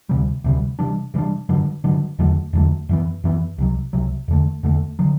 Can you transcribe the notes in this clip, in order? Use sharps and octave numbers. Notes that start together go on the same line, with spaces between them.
D2 C3 G3
D2 C3 G3
C3 E3 G3 D4
C3 E3 G3 D4
G2 D3 F#3
G2 D3 F#3
E2 D3 F#3 A3
E2 D3 F#3 A3
F#2 E3 B3
F#2 E3 B3
C2 C3 F#3
C2 C3 F#3
E2 D3 A3
E2 D3 A3
D3 F#3